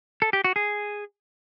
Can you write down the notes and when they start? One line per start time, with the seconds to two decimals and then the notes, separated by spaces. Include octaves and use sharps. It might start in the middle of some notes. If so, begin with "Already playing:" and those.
0.22 A4
0.33 G4
0.44 F#4
0.56 G#4